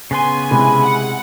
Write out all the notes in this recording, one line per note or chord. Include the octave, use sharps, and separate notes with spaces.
C#3 B3 G#5 C6
C3 G#3 E4 B5
F#5